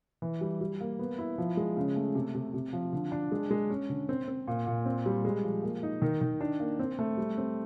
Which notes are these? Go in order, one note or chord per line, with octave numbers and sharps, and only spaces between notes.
E3
G3
G3
A#3
B3
E4
F3
G#3
C#3
A3
C3
C3
C3
F3
D3
D4
G#3
G#3
C#4
D3
C4
C4
A#2
A#2
C4
G3
G#3
F3
A#3
D#4
D#3
D#3
D4
A#3
C4
A3
G3
C4